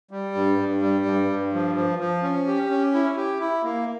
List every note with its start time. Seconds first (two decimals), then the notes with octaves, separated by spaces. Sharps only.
0.11 G3
0.35 G2
0.59 G2
0.81 G3
1.05 G2
1.28 G2
1.53 F3
1.75 F3
1.99 F3
2.23 C#4
2.47 G4
2.70 C#4
2.94 E4
3.16 G4
3.40 E4
3.63 A#3